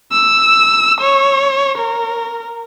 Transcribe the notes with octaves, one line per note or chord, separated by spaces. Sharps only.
E6
C#5
A#4